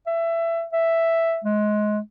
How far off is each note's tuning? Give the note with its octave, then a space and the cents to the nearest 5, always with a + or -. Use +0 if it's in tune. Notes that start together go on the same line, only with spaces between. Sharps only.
E5 +20
E5 +5
G#3 +20